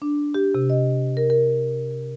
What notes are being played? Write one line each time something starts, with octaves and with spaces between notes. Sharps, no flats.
D4
G4
C3
D#5
A#4
A#4